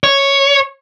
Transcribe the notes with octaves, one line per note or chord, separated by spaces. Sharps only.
C#5